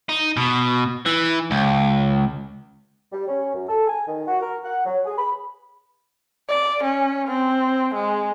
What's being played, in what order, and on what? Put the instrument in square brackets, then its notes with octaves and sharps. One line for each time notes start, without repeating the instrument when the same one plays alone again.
[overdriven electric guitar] D#4
B2
E3
C#2
[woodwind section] G3
C#4
F#2
A4
G#5
D#3
F#4
A#4
F#5
F#3
G#4
B5
[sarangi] D5
C#4
C4
G#3